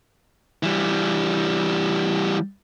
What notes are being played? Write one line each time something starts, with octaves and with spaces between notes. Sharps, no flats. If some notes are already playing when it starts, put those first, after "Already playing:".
E3 G3